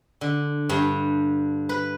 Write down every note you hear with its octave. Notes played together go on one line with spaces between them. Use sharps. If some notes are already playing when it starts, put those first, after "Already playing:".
D3
G2
B4